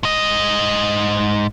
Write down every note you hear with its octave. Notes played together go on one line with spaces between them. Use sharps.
G#2 D#5